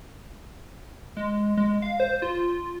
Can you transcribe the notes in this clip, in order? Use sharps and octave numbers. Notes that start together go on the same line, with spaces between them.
G#3
G#3
F5
C5
F4